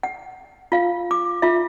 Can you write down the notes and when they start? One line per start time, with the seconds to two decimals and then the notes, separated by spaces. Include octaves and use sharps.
0.03 F#5
0.72 F4 F5
1.11 D6
1.42 F4 E5